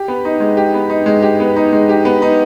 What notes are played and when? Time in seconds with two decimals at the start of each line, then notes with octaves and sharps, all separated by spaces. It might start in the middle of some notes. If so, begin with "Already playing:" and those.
Already playing: G4
0.08 B3
0.25 D#4
0.40 G#3
0.57 G4
0.74 B3
0.90 D#4
1.06 G#3
1.22 G4
1.40 B3
1.56 D#4
1.73 G#3
1.89 G4
2.05 B3
2.22 D#4